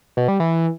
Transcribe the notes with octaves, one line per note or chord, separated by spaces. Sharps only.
B2
G3
E3